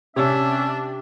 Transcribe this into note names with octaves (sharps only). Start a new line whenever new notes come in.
C3 C#4 D4 E5